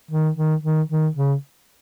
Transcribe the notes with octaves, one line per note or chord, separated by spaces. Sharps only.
D#3
D#3
D#3
D#3
C#3